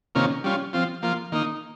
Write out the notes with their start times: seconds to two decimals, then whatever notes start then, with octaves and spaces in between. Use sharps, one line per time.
0.15 C3 D#3 A#3 C#4 F4
0.44 G3 C#4 F4
0.73 F3 C4 F4
1.02 F3 A#3 F4
1.32 D#3 A#3 D#4